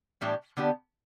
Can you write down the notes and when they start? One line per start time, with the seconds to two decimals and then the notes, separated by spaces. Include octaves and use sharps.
0.21 A2 E3 G3 D4 G4
0.57 D3 B3 D4 G4